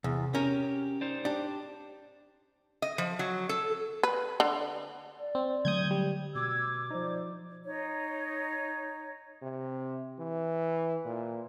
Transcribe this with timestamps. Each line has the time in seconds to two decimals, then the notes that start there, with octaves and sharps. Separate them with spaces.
0.04 E2 C3
0.35 C#4 G4 A#4
1.01 D#4 C5 D5
1.25 D4 G4
2.82 D#5
2.98 F3
3.19 F#3
3.49 A4
4.03 B4
4.40 D3
5.20 D5
5.35 C4
5.65 D3 F#3 A3 D#6 G6 G#6
5.91 G3
6.35 B2 D6 E6 G#6
6.91 F3 D#4 C5 D5
7.64 D#4 C#5
9.42 C3
10.19 E3
11.05 A#2